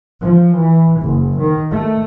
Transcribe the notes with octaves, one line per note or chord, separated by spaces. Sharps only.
F3
E3
F#1
D#3
A3